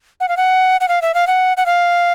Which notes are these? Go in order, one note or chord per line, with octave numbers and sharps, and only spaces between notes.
F#5
F5
F#5
F#5
F5
E5
F5
F#5
F#5
F5